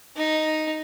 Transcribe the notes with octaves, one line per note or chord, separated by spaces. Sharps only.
D#4